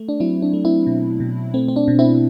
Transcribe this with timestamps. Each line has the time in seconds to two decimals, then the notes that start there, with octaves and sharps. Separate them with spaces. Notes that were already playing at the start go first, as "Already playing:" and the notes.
Already playing: A3
0.09 D4
0.20 F#3 C4 E4
0.42 D4
0.53 A3
0.65 C4 E4
0.87 B2
1.20 B2
1.54 A3 C4
1.68 C4
1.76 D4
1.88 B2
1.99 C4 E4